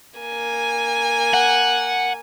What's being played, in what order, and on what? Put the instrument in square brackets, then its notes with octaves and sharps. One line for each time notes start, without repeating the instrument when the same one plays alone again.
[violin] A#3 G#5
[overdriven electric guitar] F#5